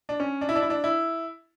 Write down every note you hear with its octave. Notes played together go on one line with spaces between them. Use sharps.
D4
C#4
D4
E4
D4
E4
D4
E4